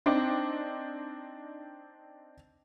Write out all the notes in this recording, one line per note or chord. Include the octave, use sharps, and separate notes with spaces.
C4 D4 D#4